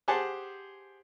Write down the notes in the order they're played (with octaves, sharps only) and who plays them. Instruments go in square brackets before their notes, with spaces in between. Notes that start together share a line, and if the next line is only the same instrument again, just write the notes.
[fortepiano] G4 G#4 C5 F#5 A5